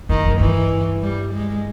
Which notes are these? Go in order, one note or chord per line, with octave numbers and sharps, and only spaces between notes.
F2 D#3
F#2
G2 E3
G3
G#3